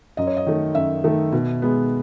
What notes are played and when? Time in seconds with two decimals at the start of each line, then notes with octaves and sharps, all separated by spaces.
0.17 F#2 D#5
0.27 C#5
0.37 D#5
0.46 D#3 A3
0.75 F#2 E5
1.04 D#3 A3
1.32 B2
1.62 G#3 B3